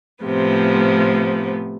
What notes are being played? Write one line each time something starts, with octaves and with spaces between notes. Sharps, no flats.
A2 C3 F3 B3